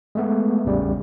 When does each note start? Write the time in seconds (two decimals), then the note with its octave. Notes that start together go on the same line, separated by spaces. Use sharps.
0.15 G#3 A3 B3
0.65 A1 E2 C#3 G3